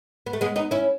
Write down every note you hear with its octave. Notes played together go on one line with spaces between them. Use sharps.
B3
A3
G#3 B3
B3 D#4
C#4 E4